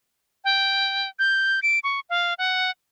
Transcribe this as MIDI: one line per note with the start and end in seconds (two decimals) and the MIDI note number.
0.44 1.09 79
1.19 1.60 91
1.63 1.79 98
1.84 2.00 85
2.10 2.34 77
2.38 2.71 78